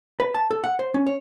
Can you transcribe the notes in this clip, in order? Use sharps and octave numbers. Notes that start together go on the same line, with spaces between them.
B4
A5
A4
F#5
C5
C#4
C#5